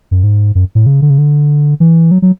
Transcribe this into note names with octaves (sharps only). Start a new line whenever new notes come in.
F#2
G#2
F#2
A2
C#3
D3
C#3
D3
E3
F#3
F#3